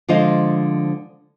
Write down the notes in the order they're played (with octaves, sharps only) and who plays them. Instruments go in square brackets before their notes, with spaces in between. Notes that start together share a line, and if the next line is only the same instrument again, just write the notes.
[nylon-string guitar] D3 F3 G#3 C5 D#5 F5